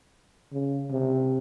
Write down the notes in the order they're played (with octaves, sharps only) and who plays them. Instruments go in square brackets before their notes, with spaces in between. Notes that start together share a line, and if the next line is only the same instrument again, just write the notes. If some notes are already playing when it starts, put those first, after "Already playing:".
[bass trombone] C#3
C3